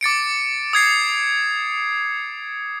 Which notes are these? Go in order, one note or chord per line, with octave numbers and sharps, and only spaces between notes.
D6 A6 C#7 D7
D#6 G#6 C7